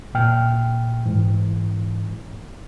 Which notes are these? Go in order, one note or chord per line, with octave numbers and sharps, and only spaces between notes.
A#2 G5 F6
G#2 E3